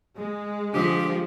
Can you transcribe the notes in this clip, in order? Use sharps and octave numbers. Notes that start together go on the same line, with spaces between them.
G#3
D3 F3 G4 D#6 B6